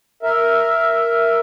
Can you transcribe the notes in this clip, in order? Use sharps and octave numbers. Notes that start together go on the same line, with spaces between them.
A#4 E5